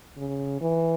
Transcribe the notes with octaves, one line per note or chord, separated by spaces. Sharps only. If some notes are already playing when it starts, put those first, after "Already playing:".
C#3
E3